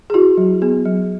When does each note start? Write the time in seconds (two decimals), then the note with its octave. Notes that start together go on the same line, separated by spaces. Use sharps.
0.10 G#4
0.14 E4 F#4
0.37 F#3
0.62 B3 G#4
0.85 F#3